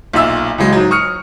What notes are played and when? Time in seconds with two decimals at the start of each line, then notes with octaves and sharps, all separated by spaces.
0.13 B1 A#2 F4 E5 E6
0.58 C#2 E3 F#3 G#3
0.73 G#2 F#3
0.91 C#6 D#6 F6 C#7